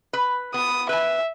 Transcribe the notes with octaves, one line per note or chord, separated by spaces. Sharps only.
B4
B3 D#6
B4 E5 G#5